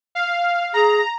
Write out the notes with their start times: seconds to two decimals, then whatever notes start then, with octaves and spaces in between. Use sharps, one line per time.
0.15 F5
0.74 G#4 A#5